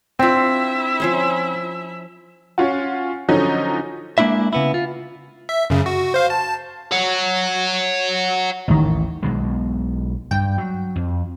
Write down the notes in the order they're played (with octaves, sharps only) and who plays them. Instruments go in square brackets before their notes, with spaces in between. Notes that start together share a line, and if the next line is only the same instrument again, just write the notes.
[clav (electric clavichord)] C4 [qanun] D4 F4 [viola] E4 E5
[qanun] F3 C#4 C5
[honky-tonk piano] C#4 F4 F#4
D3 F3 F#3 C#4 D#4
[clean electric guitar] G#3 A#3 C4 D4 E4 E5
C#3 B3 E4
F4
[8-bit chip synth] E5
F#2 C#3
F#4
C5 F5
A5
[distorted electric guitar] C#5 F#5
[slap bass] A1 [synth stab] D#2 A2 D#3
[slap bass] B1 B2 G#3
[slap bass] G2 [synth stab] G5
[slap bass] F#3
F2